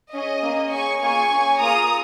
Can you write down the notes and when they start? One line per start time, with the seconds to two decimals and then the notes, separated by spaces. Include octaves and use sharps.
0.13 C#4 G#4 D#5
0.44 A#3 C#4 G#4
0.72 C#4 G#4 G#5 C#6
1.02 A#3 F4 G#4 G#5 C#6
1.32 C#4 G#4
1.60 A#3 F4 G#4 A#5 D#6